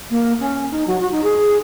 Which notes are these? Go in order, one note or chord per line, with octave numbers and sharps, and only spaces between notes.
A#3
C#4
D#4
F#3
F#4
D#4
G#4